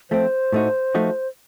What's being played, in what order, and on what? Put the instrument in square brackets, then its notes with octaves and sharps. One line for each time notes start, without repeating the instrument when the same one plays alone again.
[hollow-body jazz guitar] F3 A3 C4 [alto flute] C5
[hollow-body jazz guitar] A2 A3 D#4 F#4
F3 A3 D#4 F#4